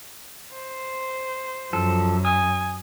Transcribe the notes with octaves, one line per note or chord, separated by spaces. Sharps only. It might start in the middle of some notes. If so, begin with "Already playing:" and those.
C5
F#2 F3 A4
G#5 D#6